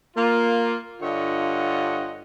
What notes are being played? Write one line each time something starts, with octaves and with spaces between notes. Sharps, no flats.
A#3 F4
G2 D3 F4 C#5 D#5 F#5